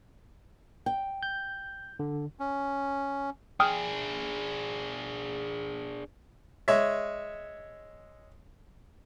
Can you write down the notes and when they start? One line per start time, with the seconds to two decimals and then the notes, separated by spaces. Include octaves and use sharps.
0.86 G5
1.23 G6
1.99 D3
2.39 C#4
3.60 D4 G#4 G5 D#6 F6
6.68 G#3 C#5 E5